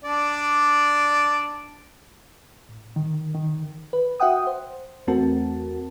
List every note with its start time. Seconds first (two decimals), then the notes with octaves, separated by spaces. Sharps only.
0.04 D4 D5
2.69 A2
2.96 D#3
3.35 D#3
3.93 B4
4.20 F#4 E5 F#5 G5 D#6
4.47 C5
5.07 E2 A3 C4 F#4 A#4 A5